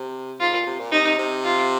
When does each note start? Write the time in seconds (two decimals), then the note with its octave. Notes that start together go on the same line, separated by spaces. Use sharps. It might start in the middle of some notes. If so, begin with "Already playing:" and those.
Already playing: C3
0.40 G#2 F4
0.53 A#2
0.66 C3
0.79 A#2
0.92 C3 D#4
1.19 C3
1.45 F4